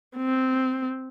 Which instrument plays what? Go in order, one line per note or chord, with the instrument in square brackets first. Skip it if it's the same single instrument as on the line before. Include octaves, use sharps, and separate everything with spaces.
[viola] C4